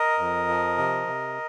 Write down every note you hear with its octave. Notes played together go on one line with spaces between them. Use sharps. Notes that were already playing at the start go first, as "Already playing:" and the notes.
Already playing: A#4 D#5
F2
F3
C3
C3